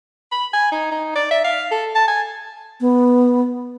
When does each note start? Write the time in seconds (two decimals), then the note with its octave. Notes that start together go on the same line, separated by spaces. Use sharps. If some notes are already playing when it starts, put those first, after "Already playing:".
0.32 B5
0.53 G#5
0.72 D#4
0.91 D#4
1.15 D5
1.31 E5
1.44 F5
1.71 A4
1.95 A5
2.08 G#5
2.81 B3